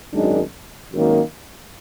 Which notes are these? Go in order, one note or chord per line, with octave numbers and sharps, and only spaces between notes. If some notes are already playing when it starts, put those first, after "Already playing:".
G#1 F#2 D#3 G#3 D4
G#1 F#2 D#3 A#3